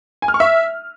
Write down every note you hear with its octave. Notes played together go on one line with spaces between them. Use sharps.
G#5
F6
C#6
E5